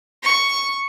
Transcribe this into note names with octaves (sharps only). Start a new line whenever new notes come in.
C#6